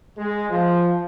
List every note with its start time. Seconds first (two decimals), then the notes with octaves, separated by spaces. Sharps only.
0.18 G#3
0.50 F3